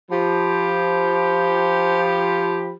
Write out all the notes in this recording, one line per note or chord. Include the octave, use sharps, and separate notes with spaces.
F3 G4 B5